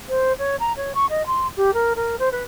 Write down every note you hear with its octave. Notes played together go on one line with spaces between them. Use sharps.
C5
C#5
A#5
C#5
C#6
D#5
C6
G4
A#4
A#4
C5
B4